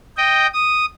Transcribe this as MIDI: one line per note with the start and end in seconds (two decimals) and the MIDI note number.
0.17 0.47 75
0.17 0.47 79
0.54 0.86 87